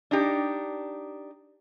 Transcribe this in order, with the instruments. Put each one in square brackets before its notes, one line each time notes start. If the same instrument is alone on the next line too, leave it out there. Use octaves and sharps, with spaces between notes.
[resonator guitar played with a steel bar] D4 D#4 G4